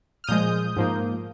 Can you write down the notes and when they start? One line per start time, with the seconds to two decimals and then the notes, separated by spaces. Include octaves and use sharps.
0.24 F6
0.27 A#2 F3 G#3 D#6 G6
0.77 G#2 F3 A#3